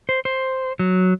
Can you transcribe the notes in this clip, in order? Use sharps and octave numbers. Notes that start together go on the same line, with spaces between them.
C5
C5
F#3